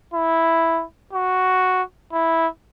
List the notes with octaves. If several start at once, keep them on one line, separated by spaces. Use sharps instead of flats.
E4
F#4
E4